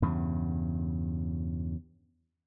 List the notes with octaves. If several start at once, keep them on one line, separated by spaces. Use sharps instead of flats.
E2 G2 C#3